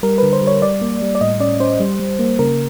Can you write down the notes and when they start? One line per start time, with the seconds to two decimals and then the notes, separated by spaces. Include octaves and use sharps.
0.03 G3 A#4
0.18 D3 B4
0.33 C5
0.42 G3
0.47 C#5
0.62 G3 D5
0.82 A#3
1.02 G3
1.15 D5
1.21 A2 D#5
1.40 C#4 D5
1.60 C#4 C5
1.80 G3
1.99 G3
2.19 A#3
2.39 C#3 A#4